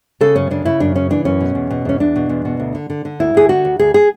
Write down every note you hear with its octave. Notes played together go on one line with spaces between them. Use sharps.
C#3 A4
F#2 C#4
C#3 D4
C#3 E4
F#2 D4
C#3 C#4
E3 D4
F#2 C#4
B2
E2
B2
E2 C#4
E2 D4
B2
E2
B2
D2
D3
D3
D3
D2 E4
D2 G#4
D3 F#4
D2
D2 G#4
G#4